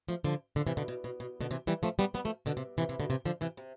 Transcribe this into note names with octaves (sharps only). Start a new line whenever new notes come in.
F3 A3
D3 F3
D3 F3
C3 E3
B2 D3
B2
B2
B2
B2 D3
C3 E3
E3 G3
F3 A3
G3 B3
G3 B3
F3 A3
B2 D3
C3
C3 E3
C3 E3
B2 D3
C3 E3
D3 F3
C3 E3
C3